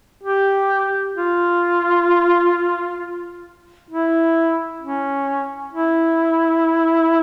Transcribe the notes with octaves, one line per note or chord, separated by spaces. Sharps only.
G4
F4
E4
C#4
E4